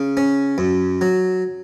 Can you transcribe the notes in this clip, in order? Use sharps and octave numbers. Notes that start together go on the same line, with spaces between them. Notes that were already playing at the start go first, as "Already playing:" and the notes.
Already playing: C#3
C#4
F#2
F#3